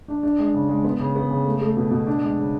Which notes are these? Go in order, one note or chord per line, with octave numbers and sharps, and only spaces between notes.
D4
D4
G#3
C#3
G#3
B3
C#3
B3
C#3
A3
A3
B2
B2
D4
G#3
C#3